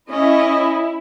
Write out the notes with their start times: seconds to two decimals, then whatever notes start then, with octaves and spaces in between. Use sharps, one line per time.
0.11 C#4 E4 D#5